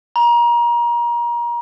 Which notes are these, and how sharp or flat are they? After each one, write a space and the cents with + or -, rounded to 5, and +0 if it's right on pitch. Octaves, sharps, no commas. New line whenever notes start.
A#5 +30